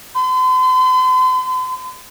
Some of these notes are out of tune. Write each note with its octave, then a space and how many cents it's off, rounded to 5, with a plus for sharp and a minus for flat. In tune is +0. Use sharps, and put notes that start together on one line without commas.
C6 -45